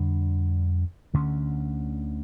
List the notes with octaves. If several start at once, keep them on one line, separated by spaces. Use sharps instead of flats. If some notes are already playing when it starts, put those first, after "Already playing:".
Already playing: F2 D3 G3 D4
D2 D3 A3 C#4